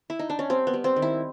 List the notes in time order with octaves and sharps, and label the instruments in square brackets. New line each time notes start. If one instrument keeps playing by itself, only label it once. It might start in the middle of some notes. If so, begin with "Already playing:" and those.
[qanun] E4
D#4
D4
C#4
G3 C4
B3
G3
C4
D#3
E4